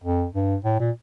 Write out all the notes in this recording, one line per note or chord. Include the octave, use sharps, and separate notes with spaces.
F2
G2
A2
A#2